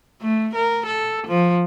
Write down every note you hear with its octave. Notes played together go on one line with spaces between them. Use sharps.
A3
A#4
A4
F3